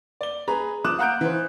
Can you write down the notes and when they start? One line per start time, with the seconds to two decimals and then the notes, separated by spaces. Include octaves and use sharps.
0.21 D5 G7
0.48 G#4 B4 A#5
0.84 F3 D6 D#6 F#6 E7
0.99 F5 F#5 A#5 F#6 G6 D7
1.21 E3 C5